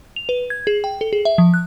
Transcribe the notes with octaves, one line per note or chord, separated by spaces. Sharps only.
F7
B4
G#6
G#4
G5
A4
G#4
E5
F3
F#6